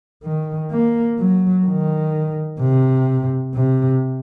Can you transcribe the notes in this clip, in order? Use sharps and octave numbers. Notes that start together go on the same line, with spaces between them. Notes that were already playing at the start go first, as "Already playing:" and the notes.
D#3
A#3
F#3
D#3
C3
C3